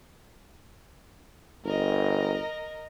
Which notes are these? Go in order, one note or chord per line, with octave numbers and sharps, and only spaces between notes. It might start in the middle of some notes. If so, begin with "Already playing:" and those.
G1 A#4 D#5